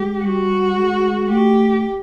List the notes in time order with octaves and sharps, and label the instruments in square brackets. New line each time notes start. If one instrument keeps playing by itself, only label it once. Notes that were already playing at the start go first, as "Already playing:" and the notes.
Already playing: [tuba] G#3 [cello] G4
[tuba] G3 [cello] F#4
[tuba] G#3
[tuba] A3 [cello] G4